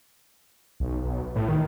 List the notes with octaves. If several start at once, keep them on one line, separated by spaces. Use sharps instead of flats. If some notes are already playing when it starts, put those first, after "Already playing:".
B1
A2
D#3